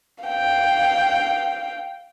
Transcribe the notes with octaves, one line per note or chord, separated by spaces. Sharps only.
F5 G5